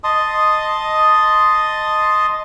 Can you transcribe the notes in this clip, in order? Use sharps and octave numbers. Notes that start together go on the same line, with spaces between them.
D#5 A5 C6 D#6